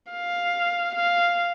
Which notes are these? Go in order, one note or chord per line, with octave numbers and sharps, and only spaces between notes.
F5
F5